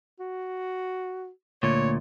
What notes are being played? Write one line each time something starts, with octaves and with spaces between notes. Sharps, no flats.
F#4
D2 A#2 C#5